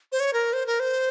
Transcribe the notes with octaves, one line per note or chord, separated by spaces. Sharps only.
C5
C#5
A#4
C5
A#4
C5